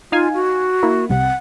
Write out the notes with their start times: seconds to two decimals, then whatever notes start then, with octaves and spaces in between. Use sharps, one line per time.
0.12 D#4 F4 F5 G#5
0.34 F#4
0.83 A#3 E4
1.10 C2 C3 F#5